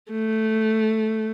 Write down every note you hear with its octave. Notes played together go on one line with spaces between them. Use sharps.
A3